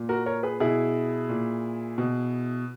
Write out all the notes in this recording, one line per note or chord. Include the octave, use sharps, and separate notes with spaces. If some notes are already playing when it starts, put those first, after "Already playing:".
Already playing: A#2
F#4 A#4
A#4 C#5
G#4 B4
B2 E4 G#4
A#2
B2